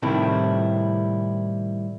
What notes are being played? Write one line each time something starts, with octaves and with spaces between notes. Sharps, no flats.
A2 C3 D#3 G3 C4 E4